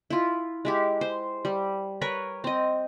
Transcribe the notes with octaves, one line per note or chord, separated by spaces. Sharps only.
E4 F4
G#3 E4 G4
C5
G3
A#4 B4 C#5
C4 D#5